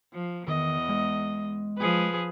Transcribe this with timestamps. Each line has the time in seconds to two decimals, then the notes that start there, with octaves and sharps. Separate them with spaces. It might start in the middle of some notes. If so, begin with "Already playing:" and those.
0.13 F3
0.48 E2 D#3 D#5
0.89 G#3
1.78 F3 G#4 B4